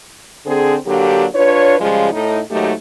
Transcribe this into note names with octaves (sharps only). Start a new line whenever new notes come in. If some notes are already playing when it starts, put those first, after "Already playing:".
D3 C4 G#4
D3 F#3 A#3 D4 G4
D4 F4 B4 C#5
C#3 F3 G3 G#3 F4
A2 D#4
D#2 G#2 F#3 A3 D#4 G4